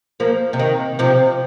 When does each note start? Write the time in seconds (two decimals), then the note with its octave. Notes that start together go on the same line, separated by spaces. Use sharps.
0.20 F3 A#3
0.53 C3
0.59 D#3
0.99 C3 F3